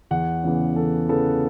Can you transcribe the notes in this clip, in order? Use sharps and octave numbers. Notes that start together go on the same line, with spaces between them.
E2 F#5
C#3 E3 B3
E2 A4
C#3 E3 B3 A4